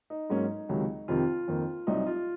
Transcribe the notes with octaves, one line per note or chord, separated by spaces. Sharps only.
D#4
G#2 F#3 A#3 C#4
C#2 C3 D#3 F#3
F2 C3 D#3 F4
F2 D#3 A#3
C2 C3 F#3 C4 D#4
F4